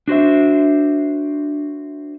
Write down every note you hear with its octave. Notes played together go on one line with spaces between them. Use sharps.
D4 F#4 C5 E5